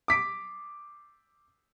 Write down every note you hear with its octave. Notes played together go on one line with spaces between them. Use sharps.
D6 B6 D7